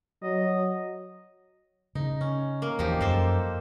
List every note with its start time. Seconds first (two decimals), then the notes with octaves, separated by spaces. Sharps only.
0.23 F#3 D#5
1.95 C#3 D#4
2.21 C#4
2.62 A#3
2.79 E2 F3 D#4 G4
3.01 F#2 A#3 A4 C5